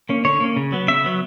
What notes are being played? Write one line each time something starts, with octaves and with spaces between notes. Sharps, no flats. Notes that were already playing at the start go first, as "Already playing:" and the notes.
A#3 C#4
D3 C#5
A#3 C#4
C#3
F#3 B3
C#3 E5
F#3 B3